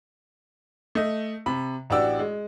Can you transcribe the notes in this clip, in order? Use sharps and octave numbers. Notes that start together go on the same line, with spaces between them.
A3 D#5
C3 B5
A1 D4 F#4 G4 D5 E6
G#3